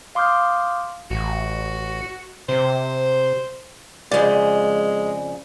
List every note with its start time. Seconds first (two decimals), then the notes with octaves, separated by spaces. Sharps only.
0.15 F5 C6 D6 D#6 F6 G6
1.11 A1 F#4
2.49 C3 C5
4.12 F2 C#3 G#3 D5